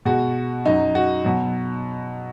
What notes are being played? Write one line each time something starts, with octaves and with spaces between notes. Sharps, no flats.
B2 G#3 F#4
F#2 F#3 D#4
F#4
B2 F#3